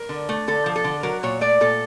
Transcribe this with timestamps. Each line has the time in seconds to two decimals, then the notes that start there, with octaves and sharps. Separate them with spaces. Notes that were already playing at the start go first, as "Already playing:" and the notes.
Already playing: A#4
0.09 D3
0.29 A3
0.48 D3 A4
0.66 F3
0.76 A4
0.84 D3
1.03 F#3 A#4
1.23 A#2 C#5
1.41 A3 D5
1.60 A#2 A4